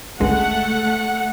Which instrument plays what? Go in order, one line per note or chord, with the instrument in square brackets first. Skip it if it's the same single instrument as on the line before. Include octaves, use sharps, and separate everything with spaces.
[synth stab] G1 C#2 G#3 [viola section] A3 F#5